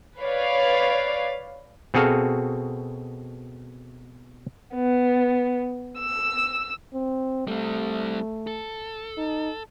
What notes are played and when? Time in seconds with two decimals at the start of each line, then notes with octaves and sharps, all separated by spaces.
0.22 B4 C#5 D5 F5
1.94 B2 C4 F#4 G#4 A4 F5
4.75 B3
5.99 E6
6.94 C4
7.47 G3 A3 C4
8.47 A4
9.18 D#4